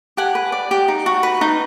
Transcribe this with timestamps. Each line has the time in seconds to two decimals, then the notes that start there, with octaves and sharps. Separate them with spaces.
0.17 G4 F#5 G#5
0.35 B4
0.52 D5
0.71 G4
0.88 D#4
1.06 F#4
1.23 B4
1.41 D#4